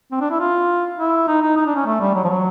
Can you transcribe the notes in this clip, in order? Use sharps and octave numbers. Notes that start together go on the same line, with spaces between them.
C4
D4
E4
F4
E4
D#4
D#4
D#4
D4
C#4
A3
G3
F#3
F3
F#3